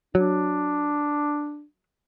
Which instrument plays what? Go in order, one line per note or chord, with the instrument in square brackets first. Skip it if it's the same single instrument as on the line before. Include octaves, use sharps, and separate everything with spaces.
[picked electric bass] F#3 [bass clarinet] D4